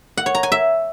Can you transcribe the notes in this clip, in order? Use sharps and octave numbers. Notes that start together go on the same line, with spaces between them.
F#5
C#5
A#5
G#5
E5